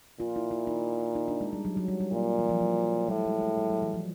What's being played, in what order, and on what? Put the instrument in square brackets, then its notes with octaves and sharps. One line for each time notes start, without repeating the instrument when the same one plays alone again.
[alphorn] A#2 [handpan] F4
[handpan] E4
E4
D#4
D#4
D4
G#3
G3
F#3
F#3
G3
G3
[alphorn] A#2 [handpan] F#3
[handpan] E3
F3
F#3
[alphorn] A2 [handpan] G3
[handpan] G#3
G#3
G3
F#3
E3
F3